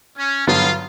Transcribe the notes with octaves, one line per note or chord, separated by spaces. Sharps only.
C#4
G2 D3 F#3 B3 F4